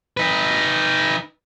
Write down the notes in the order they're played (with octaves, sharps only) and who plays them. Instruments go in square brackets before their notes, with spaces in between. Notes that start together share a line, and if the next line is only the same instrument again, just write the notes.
[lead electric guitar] D#4 B4